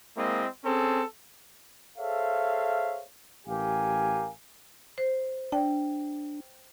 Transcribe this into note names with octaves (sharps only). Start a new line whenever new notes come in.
G#3 A#3 C4 E4 D#5
C4 C#4 G#4 A4
G#4 A4 C5 C#5 E5 F5
A1 G4 A#4 F5 G#5
C5
D4 G5